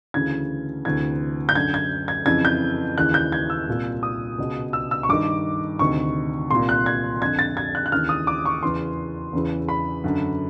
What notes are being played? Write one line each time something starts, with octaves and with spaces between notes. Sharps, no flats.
D2 C#3 E3 G#6
D2 C3 E3 G#6
G6
F#2 D3 G#6
G#6
G#6
F2 C#3 E3 G#6
G6
D#2 C#3 E3 F#6
G6
G#6
E6
C2 A#2
D#6
C#2 B2
E6
E6
C#6
G2 D#3 D6
D2 C3 D#3 C#6
C2 A#2 C6
F#6
G#6
F2 D3 G#6
A6
G#6
F#6
F#6
D#2 C#3 E3 F6
D#6
D6
C#6
E2 C#3 E3 C6
E2 C#3 E3
B5
F#2 D3